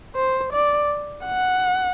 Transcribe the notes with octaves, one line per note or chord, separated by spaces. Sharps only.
C5
D5
F#5